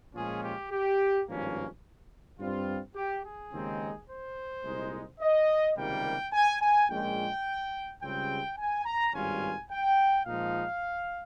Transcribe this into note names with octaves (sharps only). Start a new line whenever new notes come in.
A#2 F3 G#3 C#4 F4 G#4
G4
G4
G#1 G2 F3 A#3 C#4
G2 G3 C4 F4
G4
G#4
D#2 C#3 G#3 C4 D#4
C5
C2 A#2 G#3 D#4
D#5
C#2 C3 D#3 G3 A#3 G5
G#5
G#5
A#1 A#2 G#3 C#4 G5
C#2 C#3 G3 C4 G5
G#5
A#5
G#1 G2 G3 C#4 F4 G#5
G5
A#2 F3 G#3 D#4 F5